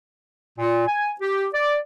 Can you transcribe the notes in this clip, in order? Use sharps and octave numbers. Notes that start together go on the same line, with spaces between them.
A#2
G#5
G4
D5